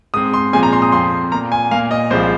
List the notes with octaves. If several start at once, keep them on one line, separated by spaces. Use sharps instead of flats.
G#2 G#3 C4 D#6
C6
A#2 F3 G#3 C4 G#5
A#5
C6
D#6
F2 F3 C4 C6
A#2 A#3 A#5
G#5
A#2 A#3 F5
D#5
C2 C3 F3 G#3 C4 C5